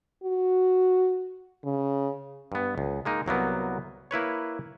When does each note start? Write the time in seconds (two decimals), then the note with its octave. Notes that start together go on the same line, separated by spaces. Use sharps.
0.24 F#4
1.64 C#3
2.52 G2 B3
2.78 C#2
3.05 G#3 A#3 D#4
3.26 C2 F#3 A#3 B3
4.11 A#3 E4 B4 C#5